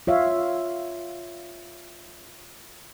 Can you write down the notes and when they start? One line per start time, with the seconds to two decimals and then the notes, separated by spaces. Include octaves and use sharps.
0.07 F4 C#5 E5 F5